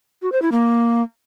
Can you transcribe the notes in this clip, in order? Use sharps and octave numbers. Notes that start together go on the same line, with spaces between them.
F#4
C5
E4
A#3